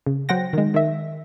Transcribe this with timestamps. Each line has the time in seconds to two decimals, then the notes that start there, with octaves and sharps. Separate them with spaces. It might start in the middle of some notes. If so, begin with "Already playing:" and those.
0.06 C#3
0.29 F#3 C5 F#5 G5 A#6
0.53 D#3 G#3
0.74 D#3 E5